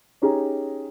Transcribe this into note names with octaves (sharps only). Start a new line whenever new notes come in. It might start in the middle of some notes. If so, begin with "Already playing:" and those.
C#4 D#4 G4 G#4 A#5